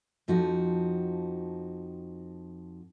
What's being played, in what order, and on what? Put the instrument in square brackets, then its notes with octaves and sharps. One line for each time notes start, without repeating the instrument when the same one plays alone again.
[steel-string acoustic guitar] F2 F3 D#4 F#4